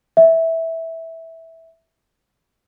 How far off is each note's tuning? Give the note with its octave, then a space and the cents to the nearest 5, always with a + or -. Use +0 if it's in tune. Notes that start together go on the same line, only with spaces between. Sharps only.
E5 -10